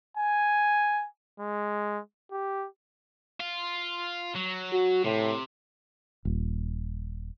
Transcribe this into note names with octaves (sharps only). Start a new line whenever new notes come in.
G#5
G#3
G4
F4
F#3
F#4
A2 C3
D#1